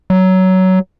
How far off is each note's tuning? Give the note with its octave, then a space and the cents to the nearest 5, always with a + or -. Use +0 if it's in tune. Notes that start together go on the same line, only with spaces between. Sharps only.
F#3 +15